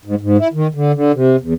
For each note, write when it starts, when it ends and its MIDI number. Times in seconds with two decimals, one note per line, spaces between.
0.05 0.15 44
0.21 0.37 44
0.38 0.48 64
0.53 0.67 51
0.74 0.92 50
0.94 1.12 50
1.14 1.36 48
1.41 1.54 40